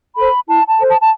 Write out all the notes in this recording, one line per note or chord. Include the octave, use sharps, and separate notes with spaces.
A4 C5 B5
E4 A5
A5
A4 C5
A5
A5